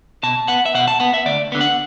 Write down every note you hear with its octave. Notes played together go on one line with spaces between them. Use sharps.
B2 A5
B3 F#5
E5
B2 F#5
A5
B3 F#5
E5
D2 D5
D3 B3
F#5